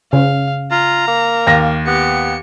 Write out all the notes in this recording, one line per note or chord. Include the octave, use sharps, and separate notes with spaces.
C#3 F5
F4 A#5
A#3
D#2 A#6
B3 G4 C#7